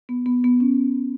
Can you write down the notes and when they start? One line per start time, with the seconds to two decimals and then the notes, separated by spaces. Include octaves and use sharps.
0.09 B3
0.26 B3
0.44 B3
0.60 C#4